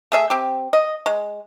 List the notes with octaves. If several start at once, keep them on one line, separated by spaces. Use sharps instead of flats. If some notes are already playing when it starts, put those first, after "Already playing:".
A3 G#4 E5
C4 G4
D#5
G#3